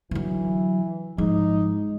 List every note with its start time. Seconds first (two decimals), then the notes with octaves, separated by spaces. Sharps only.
0.11 D3 E3 F#3
1.18 G#2 F3 G#3 D#4